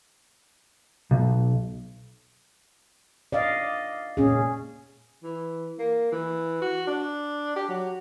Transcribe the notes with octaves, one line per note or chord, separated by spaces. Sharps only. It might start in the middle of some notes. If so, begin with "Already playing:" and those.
B1
D5 D#5 F5
A#2 C#4 G#4
E3
A#3
E3
F#4
D4
G4
F#3